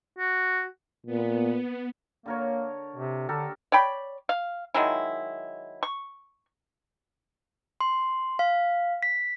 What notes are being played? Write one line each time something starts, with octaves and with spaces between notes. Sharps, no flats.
F#4
A#2 B3
D3 A#3 A#4 C#5
C3
D3 G4 A4 A#4
C#5 D5 G5 B5
F5
D#3 F#3 G#3 E4
C#6
C6
F5
B6